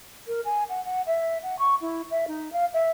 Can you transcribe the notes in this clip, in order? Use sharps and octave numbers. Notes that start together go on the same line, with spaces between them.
A#4
G#5
F#5
F#5
E5
F#5
C#6
E4
E5
D#4
F5
E5